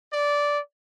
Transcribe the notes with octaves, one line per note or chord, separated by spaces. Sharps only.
D5